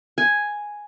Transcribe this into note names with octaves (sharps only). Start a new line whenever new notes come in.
G#5